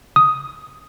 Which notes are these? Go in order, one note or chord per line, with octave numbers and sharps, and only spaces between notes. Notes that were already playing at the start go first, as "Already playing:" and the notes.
D#6